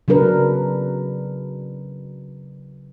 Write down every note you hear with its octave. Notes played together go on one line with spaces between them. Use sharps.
C#3 F#3 D4 A#4 B4